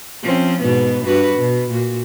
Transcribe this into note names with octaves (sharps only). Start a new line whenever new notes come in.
F3 C4 C#4
G#2 B2 B3
G2 F#4 B4
B2
A#2 F#4